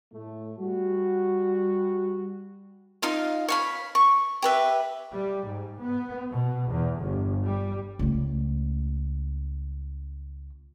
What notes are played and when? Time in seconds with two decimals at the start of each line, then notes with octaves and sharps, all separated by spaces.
0.13 A2 A3
0.59 G3 F#4
3.02 D#4 F4 F5
3.49 C#5 F5 B5
3.95 C#6
4.42 G4 B4 E5
5.12 G3
5.46 G#2
5.81 B3
6.30 B2
6.70 E2
7.01 G1
7.45 G3
7.99 C#2 A3